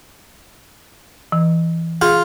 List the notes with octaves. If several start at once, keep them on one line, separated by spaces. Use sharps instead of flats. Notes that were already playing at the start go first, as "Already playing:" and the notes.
E3
F4 G#4